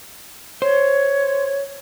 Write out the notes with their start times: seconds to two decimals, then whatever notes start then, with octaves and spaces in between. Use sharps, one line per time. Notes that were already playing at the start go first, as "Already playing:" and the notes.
0.62 C5 C#5